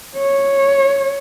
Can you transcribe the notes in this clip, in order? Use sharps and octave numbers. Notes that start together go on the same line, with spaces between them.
C#5